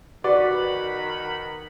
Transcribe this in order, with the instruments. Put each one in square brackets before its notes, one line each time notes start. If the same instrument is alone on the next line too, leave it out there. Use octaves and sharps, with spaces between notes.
[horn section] D#3 F#5 B5 [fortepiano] F#4 B4 D5